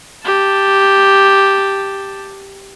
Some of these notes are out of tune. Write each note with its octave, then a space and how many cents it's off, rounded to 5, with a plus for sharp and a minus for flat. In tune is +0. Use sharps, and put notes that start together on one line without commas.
G4 +0 A5 +0